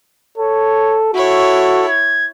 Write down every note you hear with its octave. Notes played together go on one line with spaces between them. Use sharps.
A4 C#5
E4 F#4 A4 C#5
G#6